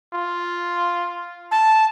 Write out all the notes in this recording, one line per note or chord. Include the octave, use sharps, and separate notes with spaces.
F4
A5